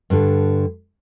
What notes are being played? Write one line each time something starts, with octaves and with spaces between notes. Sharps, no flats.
G2 D3